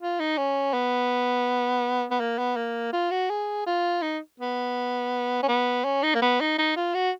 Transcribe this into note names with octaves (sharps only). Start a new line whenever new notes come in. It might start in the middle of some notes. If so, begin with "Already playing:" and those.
F4
D#4
C#4
B3
B3
A#3
B3
A#3
F4
F#4
G#4
F4
D#4
B3
C#4
B3
C#4
D#4
A#3
B3
D#4
D#4
F4
F#4